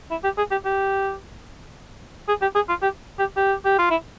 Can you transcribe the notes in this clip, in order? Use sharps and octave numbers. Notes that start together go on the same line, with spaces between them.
E4
G4
G#4
G4
G4
G#4
G4
G#4
F4
G4
G4
G4
G4
F4
E4